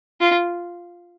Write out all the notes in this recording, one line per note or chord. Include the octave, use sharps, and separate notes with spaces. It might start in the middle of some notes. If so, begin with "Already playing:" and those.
F4